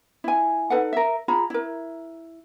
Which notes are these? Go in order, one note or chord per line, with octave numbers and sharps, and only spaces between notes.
E4 G#5
D#4 A4 B4 F#5
A#4 E5
F4 G#4 A#5 B5
E4 A#4